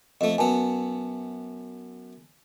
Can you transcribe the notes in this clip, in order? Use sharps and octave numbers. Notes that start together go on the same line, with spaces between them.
F2 A3 D#5
F#2 B3 G#5 A5